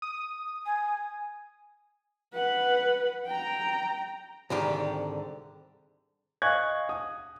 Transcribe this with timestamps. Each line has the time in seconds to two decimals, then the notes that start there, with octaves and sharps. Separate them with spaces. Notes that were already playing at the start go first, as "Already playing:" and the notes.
0.02 D#6
0.66 G#5
2.33 B4 F#5
3.27 G5 A#5
4.50 C2 G#2 D3 D#3 G4
6.42 D#5 F5 G#5 C#6 F#6 G#6
6.89 D#6